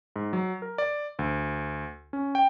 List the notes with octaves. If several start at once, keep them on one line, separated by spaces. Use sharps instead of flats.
G#2
F#3
A#4
D5
D2
C#4
G5